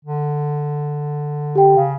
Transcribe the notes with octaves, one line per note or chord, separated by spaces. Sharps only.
D3
G4 G5
C#3 F5